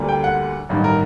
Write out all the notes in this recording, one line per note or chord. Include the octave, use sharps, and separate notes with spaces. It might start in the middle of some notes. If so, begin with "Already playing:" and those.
Already playing: D2 D3 G3 A#3
G5
F#5
A1 G2 D#3
A#4